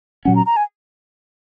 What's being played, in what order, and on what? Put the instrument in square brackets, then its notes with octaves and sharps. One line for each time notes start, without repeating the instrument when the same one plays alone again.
[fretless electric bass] A#2 F#3 C#4 [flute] F#5
[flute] A#5
A#5
G#5